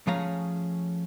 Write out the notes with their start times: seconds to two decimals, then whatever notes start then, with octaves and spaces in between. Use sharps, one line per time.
0.07 F3 A3 C#4 G#4 F5 A#5